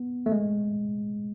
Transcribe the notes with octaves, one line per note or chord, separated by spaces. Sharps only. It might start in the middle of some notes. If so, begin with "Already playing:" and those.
Already playing: B3
A3
G#3